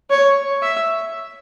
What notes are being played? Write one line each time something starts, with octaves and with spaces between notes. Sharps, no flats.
C#5
E5